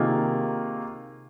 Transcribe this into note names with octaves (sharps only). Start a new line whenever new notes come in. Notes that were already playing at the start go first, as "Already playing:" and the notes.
Already playing: C3 D#3 A#3 F4 G#4